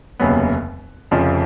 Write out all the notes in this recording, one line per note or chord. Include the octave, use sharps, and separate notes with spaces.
F1 D#2 C#3 F#3 B3
F1 F2 C#3 F3